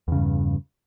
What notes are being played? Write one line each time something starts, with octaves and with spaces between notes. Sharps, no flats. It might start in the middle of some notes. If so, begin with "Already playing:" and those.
E2 G2 C#3